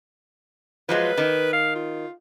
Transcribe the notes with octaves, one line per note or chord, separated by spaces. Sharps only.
F3 F#3 G#3 B4
D#3
F5
F4